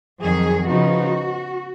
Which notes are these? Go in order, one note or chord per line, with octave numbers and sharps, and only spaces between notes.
F2 D#3 F#3 G#4
C#3 F3 B3 D#4 F#4